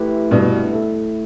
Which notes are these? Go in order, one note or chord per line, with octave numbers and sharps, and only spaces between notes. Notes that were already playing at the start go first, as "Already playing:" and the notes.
Already playing: A3 E4 G4 B4
G2 B2
A3 E4 A4